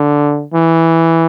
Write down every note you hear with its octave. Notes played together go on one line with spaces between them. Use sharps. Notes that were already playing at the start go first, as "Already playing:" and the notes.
Already playing: D3
E3